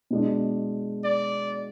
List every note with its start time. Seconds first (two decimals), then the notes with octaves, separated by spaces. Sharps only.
0.11 B2 G#3 D4
1.04 D5